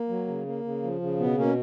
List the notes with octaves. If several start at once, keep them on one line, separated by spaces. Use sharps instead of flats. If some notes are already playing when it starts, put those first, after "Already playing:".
Already playing: A#3
F#3
C#3
A#3
C#3
F3
C#3
B2 B3
B2 A#3 C#4